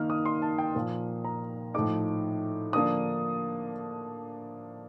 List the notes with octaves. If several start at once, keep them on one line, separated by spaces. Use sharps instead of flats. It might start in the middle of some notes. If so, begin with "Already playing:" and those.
Already playing: D#3 A#3 D#4 F6
D#6
C6
A5
G5
A#2 F3 A#3
A#5
A2 F3 A3 D#4 D6
D3 F3 A#3 D4 D#6